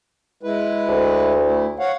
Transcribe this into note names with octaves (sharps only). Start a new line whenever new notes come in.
G#3 E4 B4
D2
A3 E4
C#5 F5 F#5